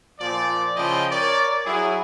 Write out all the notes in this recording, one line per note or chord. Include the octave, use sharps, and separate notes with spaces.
A#2 F3 D5
C#3 F3 E4 D#5 G5
A#4 C#5 D5
F#3 E4 G#4